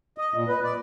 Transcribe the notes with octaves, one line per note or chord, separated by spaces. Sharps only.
D#5
A#2
B4
D5